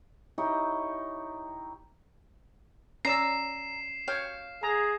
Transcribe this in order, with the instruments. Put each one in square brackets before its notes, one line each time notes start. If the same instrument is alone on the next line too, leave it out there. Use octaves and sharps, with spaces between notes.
[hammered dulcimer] D#4 E4 G4 C#5
[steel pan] C#4 D5 E6 [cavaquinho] A#5 [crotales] C7 E7
[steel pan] C#5 G5 [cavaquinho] F5
[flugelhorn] G#4 [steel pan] A#5